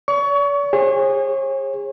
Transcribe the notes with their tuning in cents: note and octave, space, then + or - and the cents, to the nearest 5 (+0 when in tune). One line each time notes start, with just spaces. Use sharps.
D5 -45 C#6 +25
G#4 -30 C#5 -45